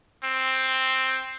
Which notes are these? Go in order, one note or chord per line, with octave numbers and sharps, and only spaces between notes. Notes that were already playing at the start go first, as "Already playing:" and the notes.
C4